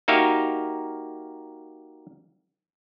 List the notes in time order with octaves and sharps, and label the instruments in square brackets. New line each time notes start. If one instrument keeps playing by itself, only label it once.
[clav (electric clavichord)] A#3 D#4 F#4 G4 E5 F5